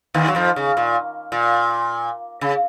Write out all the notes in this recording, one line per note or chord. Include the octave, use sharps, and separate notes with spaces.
D#2 D#3
F#3
F2 F3
C#3
A#2
A#2
C#3